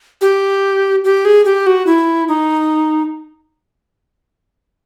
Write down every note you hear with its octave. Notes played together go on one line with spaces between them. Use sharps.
G4
G4
G#4
G4
F#4
E4
D#4